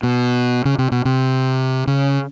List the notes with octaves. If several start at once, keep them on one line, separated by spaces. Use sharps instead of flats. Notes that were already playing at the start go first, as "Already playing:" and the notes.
B2
C#3
C3
B2
C3
C#3